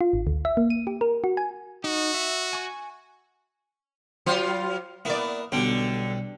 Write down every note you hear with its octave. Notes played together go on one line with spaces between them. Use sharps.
F4
G#1
D2
E5
A#3
D#7
G4
A#4
F#4
G#5
D#4 F#4
E5
G#5 C#6
F#3 F4 C5
A#3 B3 E4 D5
B1 D3 G3 G5